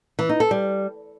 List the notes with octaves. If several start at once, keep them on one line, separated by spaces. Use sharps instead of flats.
E3
D#4
A4
G3